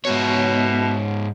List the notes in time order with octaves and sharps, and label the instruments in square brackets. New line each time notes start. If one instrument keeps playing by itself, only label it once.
[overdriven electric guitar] G#2 C#5 [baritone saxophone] B2